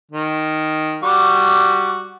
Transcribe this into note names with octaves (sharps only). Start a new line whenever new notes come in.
D#3
G3 F#4 D6